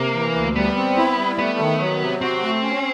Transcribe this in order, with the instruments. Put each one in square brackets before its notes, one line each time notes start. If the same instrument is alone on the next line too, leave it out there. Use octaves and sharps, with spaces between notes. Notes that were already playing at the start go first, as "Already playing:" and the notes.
Already playing: [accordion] C3 [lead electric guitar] A#3
[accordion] E3
D2
[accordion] G3 [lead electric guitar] B3
[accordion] C4
E4
G3
[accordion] A3 [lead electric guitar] B3
[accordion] D#3
F#3
C3
[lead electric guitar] C4 [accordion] F#4
[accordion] A3
C#4